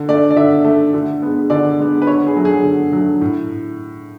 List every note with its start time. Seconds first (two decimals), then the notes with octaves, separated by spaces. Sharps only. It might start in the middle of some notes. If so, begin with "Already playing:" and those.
Already playing: D3
0.09 A3 D5
0.31 D5
0.36 D3 E5
0.64 A3
0.94 D3
1.22 G#3 B3
1.50 D3 D5
1.79 G#3 B3
2.02 B4
2.07 D3 C#5
2.27 G#4
2.36 F#3 A3
2.45 G#4
2.64 D3
2.92 F#3 A3
3.21 A2